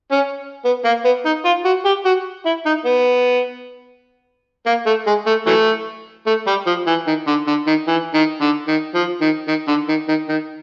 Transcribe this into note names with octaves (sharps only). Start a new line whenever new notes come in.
C#4
B3
A#3
B3
D#4
F4
F#4
G4
F#4
E4
D#4
B3
A#3
A3
G#3
A3
E3 F#3 A3
A3
G3
F3
E3
D#3
D3
D3
D#3
E3
D#3
D3
D#3
F3
D#3
D#3
D3
D#3
D#3
D#3